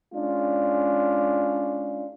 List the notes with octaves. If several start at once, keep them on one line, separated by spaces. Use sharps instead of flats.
G#3 C#4 D4 F4